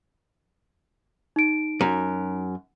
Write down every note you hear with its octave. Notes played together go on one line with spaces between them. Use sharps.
D#4 D7
F#2